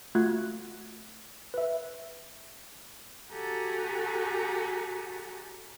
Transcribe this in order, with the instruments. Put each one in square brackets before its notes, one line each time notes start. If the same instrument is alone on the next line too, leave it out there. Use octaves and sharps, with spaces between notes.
[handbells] A3 F4 F#4 F#5 F#6 G#6
B4 E5
[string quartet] F#4 G4 A4 F#5 G#5 A#5